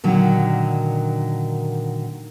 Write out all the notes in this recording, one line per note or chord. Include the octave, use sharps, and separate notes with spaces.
A#2 D3 D#3 F#3